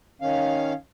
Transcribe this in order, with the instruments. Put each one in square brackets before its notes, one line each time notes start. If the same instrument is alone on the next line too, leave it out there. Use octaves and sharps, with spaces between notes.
[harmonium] D#3 C#4 F5